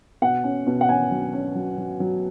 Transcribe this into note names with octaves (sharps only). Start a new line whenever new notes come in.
B2 F#5
C#4
B2
F#5
C#4 G#5
F#3
C#4
F#3
F#3
F#3